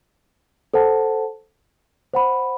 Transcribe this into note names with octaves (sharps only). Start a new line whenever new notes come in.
A4 C5 F#5 A5
C5 F#5 B5